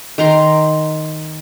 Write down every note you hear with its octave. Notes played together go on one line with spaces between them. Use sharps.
D#3 A#5 C6